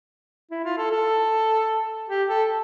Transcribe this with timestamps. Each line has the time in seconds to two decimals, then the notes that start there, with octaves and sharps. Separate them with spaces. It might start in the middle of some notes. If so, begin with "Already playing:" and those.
0.51 E4
0.64 F4
0.78 A4
0.91 A4
2.09 G4
2.29 A4